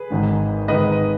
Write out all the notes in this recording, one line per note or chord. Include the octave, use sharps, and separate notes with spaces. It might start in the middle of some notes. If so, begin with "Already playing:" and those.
Already playing: G#4 B4
G#1 G#2 D#3 G#3
G#1 G#2 D#3 G#3 B4 D#5